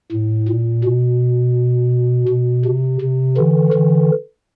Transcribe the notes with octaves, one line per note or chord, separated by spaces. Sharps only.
A2
A#2
B2
B2
C3
C3
D3 E3
D3 E3